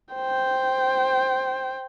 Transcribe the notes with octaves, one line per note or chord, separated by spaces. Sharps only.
C5 G5